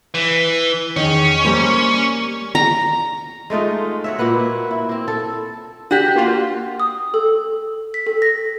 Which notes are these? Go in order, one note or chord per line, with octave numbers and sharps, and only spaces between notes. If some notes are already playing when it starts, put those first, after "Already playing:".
E3
E2 D#3 C#4
G3 A#3 C5
A#5
G#3 A3 D#4 F4
F#4 C#5 E5
A#2 A#3 B4 F#5
E4
A#3 C4
A4
D4 F#4 G4
A#3 F4
D#6
A4
B6
A4
A#6